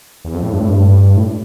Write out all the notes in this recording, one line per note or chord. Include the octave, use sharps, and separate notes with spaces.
E2
F2
A2
G2
A2
G2
A2